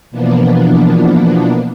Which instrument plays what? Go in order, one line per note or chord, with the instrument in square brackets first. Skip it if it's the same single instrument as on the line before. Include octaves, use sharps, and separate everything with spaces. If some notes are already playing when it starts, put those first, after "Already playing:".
[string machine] B2 E3 F3 A#3 B3 D4